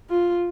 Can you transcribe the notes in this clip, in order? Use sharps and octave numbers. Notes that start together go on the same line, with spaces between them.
F4